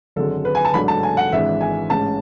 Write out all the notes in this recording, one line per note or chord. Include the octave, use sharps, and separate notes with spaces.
G#1 F#2 D3 G#3 A4
B4
G#5
A5
A1 G#2 F#3 A3 D4 B5
A5
G#5
F#5
G#1 G#2 E3 G#3 D4 E5
G#5
A1 G#2 G#3 C#4 A5